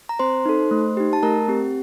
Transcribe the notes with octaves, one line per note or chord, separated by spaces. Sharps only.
A#5
C4 C5 C6
D#4 A4
A3
D#4 G4
A5
A3 A#4 A#5
C4 G4